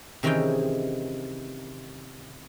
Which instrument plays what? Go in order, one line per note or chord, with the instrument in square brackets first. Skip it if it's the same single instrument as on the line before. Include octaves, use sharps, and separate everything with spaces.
[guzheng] C3 D#3 E3 C#4 G#4 G5